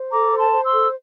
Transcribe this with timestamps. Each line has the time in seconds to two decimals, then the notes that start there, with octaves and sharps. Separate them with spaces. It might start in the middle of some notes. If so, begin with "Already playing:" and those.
Already playing: C5
0.12 A4 A#5 D6
0.32 C5
0.38 A5 C6
0.51 C5
0.65 C6 E6
0.71 A4